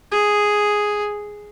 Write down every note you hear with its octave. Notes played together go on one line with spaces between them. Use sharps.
G#4